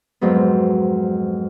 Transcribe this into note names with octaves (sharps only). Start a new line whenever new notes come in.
F2 G#2 F#3 B3